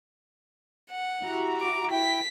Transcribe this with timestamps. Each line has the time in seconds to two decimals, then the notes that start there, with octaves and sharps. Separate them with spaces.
0.90 F#5
1.23 E4 F#4 G4 A#5
1.61 D6
1.92 E4 G5 B6